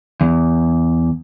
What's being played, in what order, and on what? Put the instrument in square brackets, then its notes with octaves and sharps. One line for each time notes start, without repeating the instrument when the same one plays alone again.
[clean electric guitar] E2